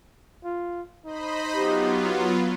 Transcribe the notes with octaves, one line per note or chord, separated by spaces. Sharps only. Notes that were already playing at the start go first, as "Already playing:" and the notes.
F4
D#4 C5 D#5 B5
F#3 B3 F4 G4